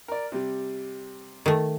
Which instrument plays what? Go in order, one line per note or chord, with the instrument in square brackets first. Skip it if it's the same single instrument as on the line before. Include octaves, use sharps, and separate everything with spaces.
[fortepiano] A#4 D5
C3 G3
[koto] D#3 A3